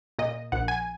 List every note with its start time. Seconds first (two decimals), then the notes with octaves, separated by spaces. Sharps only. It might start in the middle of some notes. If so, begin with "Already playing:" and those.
0.19 A#2 D#5
0.52 A#1 F#5
0.68 G#5